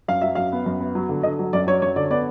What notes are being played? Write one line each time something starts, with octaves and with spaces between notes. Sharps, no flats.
F#2 F5
F#3 E5
F#2 F5
B3
F#2
B3
F#3
D3
D3 D#5
F#3
F#2 D5
F#3 C#5
F#2 C#5
D3 D5
B3 D5